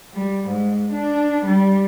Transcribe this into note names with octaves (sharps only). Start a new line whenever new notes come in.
G3
G#2
D4
G3